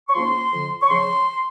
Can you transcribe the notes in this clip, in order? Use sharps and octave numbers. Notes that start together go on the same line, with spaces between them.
C#6
G#2 F3 A#3 C#4 C6
F2 D3 F3
C#6
C#3 F3 C6